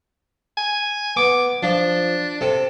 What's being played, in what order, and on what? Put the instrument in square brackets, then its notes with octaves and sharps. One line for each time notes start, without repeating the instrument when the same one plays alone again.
[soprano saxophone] G#5
[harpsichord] B3 [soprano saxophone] D6
[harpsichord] F3 [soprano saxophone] D4
[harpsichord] C3 [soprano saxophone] A4